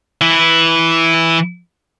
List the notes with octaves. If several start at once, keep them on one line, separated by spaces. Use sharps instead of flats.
E3 E4